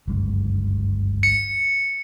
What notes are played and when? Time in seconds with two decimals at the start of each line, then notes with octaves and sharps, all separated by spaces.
0.08 G1 C#2 F#2
1.23 C#7